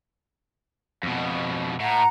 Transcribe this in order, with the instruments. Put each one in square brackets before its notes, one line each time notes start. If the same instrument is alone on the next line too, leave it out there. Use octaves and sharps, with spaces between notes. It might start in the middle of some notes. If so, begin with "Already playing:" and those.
[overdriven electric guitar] F2 B2
[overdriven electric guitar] A2 [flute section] F#5 A#5